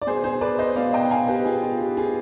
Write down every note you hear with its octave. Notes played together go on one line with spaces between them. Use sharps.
D5
B2 B3 G#4 C5
G#4 C5
B4 D5
C5 D#5
B2 B3 D5 F5
D#5 G5
F5 G#5
G4 B4
B2 B3 F4 G#4
F4
G4
F4 G#4